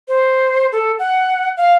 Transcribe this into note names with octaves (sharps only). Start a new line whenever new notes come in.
C5
A4
F#5
F5